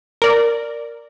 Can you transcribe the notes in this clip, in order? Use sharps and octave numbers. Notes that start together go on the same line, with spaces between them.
A#4 D5